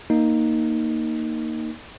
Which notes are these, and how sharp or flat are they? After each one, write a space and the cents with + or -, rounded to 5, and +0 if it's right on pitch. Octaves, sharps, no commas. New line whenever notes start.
A#3 +0 D#4 +0